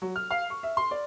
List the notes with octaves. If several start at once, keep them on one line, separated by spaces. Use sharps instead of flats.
F#3
F6
F5
C#6
E5
C6
D5